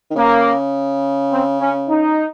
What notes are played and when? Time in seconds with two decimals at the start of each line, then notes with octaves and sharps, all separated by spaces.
0.10 D#3
0.15 C#3 A#3
1.31 C4
1.59 C#4
1.89 D#4